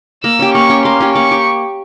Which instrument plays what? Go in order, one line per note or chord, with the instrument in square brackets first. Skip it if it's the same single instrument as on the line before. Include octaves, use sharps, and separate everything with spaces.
[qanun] A#3 [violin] E6
[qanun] C#4 G4
[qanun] A#3 [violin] C#6
[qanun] C#4 G4
[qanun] A#3 [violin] C6
[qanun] C#4 G4
[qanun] A#3 [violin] C#6
[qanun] G4